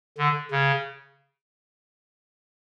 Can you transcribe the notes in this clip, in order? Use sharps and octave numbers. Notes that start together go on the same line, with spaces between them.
D3
C#3